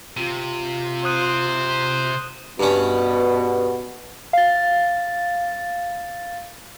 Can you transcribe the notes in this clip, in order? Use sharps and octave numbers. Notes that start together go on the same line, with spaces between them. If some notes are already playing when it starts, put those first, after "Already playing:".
C3 F4
C5 D#6 F#6 D#7
G2 B2 C#4
F5 A6